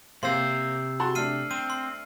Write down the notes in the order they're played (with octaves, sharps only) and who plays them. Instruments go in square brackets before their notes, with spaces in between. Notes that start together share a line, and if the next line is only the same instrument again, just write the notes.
[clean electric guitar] C3 C5 [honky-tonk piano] A#3 C4 [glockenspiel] C6 E6
[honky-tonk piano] F#4 A5 C6
[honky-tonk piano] A3 D4 [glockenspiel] F6 C7 D#7
[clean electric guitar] C4 [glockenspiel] D#7
[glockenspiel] C6